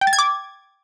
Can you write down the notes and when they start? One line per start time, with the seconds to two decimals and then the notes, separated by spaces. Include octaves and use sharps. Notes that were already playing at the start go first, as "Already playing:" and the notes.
0.01 G5
0.07 A6
0.13 G#6
0.19 D6